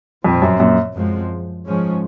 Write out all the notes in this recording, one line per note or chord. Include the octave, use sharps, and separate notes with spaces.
A#1 F2 A#2 F3 C4
F#2
F#2 A#2
F#2 F3 G#3 C4
G#2 F3 G#3 C#4